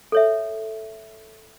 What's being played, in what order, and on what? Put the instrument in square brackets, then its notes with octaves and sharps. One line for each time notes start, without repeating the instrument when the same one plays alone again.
[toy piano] A4 C#5 E5